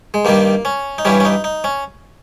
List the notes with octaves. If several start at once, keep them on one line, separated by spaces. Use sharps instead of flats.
G#3
G2 D#3 G3 A#3
C#4
D#4
G2 E3 G3 C#4
C#4
D#4
D#4
C#4